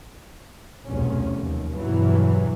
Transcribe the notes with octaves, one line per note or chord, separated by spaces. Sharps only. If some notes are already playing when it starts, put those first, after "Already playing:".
F1 B1 E2 F#3 C#4
D#2
E2 G2 B2 E3 F#3